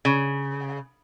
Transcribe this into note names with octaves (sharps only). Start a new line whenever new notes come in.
C#3